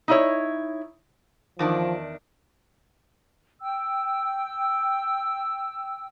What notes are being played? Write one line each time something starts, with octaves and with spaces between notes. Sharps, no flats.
D#4 E4 C#5
E2 D#3 F3 D4
G5 E6